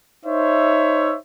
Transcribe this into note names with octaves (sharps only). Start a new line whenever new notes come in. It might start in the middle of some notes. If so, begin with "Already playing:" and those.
D#4 C5 C#5 E5